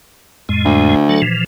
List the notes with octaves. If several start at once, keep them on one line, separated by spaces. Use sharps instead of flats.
F2 A2 G#3
D2
F#3 A4
A#2 E3 F3